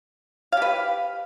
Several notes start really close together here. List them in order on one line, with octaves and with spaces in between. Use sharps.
F5 G4 B4